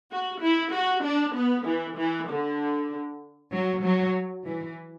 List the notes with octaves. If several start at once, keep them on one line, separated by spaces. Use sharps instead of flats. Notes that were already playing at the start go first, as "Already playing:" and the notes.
F#4
E4
F#4
D4
B3
E3
E3
D3
F#3
F#3
E3